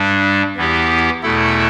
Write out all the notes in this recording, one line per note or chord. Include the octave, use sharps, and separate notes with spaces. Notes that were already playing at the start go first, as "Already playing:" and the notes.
Already playing: G2 G3 D4
E2 E3 B3 E4 G4
E2 B2 A3 E4 A4